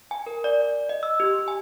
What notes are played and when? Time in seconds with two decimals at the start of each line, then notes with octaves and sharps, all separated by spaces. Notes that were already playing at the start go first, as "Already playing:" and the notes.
0.11 G#5
0.26 A#4
0.44 D5
0.62 D5
0.89 D#5
1.03 E6
1.20 G4
1.48 G#5